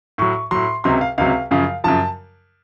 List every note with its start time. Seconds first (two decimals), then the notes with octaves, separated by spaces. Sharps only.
0.18 A2 F#3 C#6
0.51 A2 F#3 C6
0.84 C#2 C3 F#3 C6
1.01 F5
1.18 C#2 C3 F#3 F5
1.51 F#2 C#3 F3 F5
1.84 F#2 C#3 F3 A5